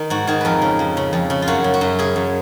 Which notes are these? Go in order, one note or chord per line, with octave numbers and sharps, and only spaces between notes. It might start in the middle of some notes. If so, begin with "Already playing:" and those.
Already playing: D#3 D#4
G#2 F#4
D#3 G#4
F2 A#4 B4
C#3
F2
C#3
F2
C#3
F4
F#2 F#4
C#3
F#4
F#2
C#3 G#4
F#2